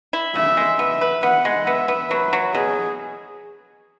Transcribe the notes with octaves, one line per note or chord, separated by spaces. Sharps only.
E4
C#3 E5
G#3
B3 E5
B4
B3 F#5
G#3
B3 E5
B3
F#3 B4
F#3
B2 G#4